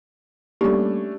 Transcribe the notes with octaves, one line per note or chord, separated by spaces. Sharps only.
G3 A3 A#3 C#4 D4 G4